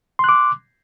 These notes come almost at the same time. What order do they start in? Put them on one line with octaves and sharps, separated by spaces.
C6 F#6 D6